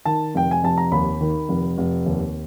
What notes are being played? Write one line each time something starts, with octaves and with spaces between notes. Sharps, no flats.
D#3 A5
F1 G5
G#5
F1 A5
A#5
D#2 B5
D#3
F1
F1
D#2